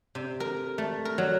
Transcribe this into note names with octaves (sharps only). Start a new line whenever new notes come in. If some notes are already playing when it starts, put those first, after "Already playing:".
C3
A#4
A3
A#4
F#3